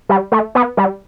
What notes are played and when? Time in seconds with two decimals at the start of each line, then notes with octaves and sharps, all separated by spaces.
0.09 G3
0.32 A3
0.55 B3
0.77 G3